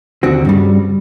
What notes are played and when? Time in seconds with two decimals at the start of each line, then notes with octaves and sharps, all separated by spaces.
0.23 D#2 D3 C4 F#4
0.45 G2 C#3 G3